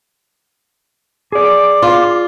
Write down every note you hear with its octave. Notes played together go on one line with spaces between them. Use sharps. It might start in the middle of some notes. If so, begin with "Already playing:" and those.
G#4 D5 D6
F4